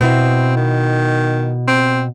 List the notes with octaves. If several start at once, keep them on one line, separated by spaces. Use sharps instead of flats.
B2 B3 C4 E4
D#3
C4